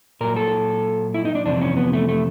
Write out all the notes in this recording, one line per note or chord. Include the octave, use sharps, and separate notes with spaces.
A#2 F#3 A#4
A4
E4
D#4
D4
F2 C3 E3 D4
C#4
B3
A3
A3